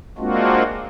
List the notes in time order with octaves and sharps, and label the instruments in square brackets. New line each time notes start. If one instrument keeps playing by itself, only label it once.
[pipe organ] G#3 A#3 C4 D4 F4 F#4